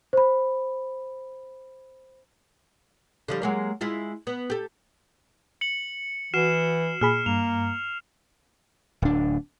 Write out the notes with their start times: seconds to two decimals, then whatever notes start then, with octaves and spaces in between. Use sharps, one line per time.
0.13 C5 B5
3.28 D3 F3 G3
3.42 F#3 G#3 A#3
3.81 G#3 E4 F4
4.27 B3
4.50 G4 A4
5.61 C#7 F#7
6.34 E3 F#4 F6 C7 E7
7.01 A#2 G#4 B5 F6
7.26 G2 A#3 F7
9.02 D1 D4